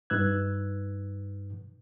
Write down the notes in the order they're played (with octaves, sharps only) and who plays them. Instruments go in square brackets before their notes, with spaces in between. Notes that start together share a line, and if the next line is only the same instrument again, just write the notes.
[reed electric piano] G2 D#4 B4 E6 F#6 G#6